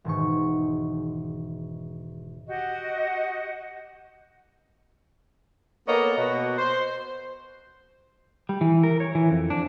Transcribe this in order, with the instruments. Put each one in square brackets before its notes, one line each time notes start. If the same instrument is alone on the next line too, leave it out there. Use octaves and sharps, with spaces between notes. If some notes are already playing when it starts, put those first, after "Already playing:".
[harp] E1 G#2 B2 D#3 G#3 C#6
[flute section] F#4 G4 D#5 F#5
[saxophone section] A#3 B3 A4 C#5 D#5
B2 F#4
C5
[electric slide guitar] G3
E3
A#4
C#5
E3
F2
D4